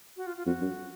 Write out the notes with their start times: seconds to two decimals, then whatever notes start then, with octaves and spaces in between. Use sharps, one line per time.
0.17 F#4
0.26 F4
0.37 F4
0.46 F2 F#4
0.61 F#2